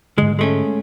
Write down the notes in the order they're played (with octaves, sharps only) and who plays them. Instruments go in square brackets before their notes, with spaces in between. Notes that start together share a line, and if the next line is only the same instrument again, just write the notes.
[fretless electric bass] G#2 D3 [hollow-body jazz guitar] G#3
[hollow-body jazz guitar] G#3 A3 C#4